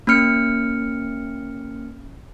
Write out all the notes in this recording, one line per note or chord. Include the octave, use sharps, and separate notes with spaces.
A#3 C#4 F6 C#7